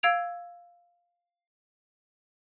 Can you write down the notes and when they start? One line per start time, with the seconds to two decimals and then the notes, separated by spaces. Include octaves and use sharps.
0.03 F5 E6 G#6 D7 F7